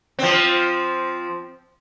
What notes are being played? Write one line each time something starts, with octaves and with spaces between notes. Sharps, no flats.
F3 C4